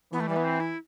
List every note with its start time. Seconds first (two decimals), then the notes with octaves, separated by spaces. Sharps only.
0.12 E3 B3
0.20 A3
0.29 G3
0.36 B3
0.44 C4
0.60 E4